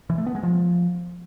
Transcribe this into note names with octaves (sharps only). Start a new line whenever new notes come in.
E3
A3
B3
G#3
F3